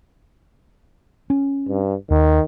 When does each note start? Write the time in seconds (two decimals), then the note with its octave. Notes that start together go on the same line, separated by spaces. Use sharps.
1.30 C#4
1.69 G2
2.10 D#2 D#3